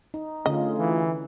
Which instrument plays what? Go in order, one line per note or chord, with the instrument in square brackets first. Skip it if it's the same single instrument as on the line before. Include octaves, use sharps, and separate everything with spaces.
[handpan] D#4
[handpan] D3 C#4 [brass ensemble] A3 F4 G#4 [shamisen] D#5
[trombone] E3